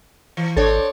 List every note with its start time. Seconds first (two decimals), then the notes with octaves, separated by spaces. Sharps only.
0.37 E3
0.57 G#1 C4 D4 A4 C#5